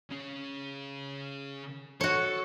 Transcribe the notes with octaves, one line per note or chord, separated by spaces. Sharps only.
C#3 C#4
F#4 A4 C#5